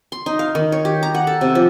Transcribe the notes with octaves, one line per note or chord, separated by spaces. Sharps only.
C6
D#4
F5
D#3
C#5
G4
A#5
F#5
A4
C3
F3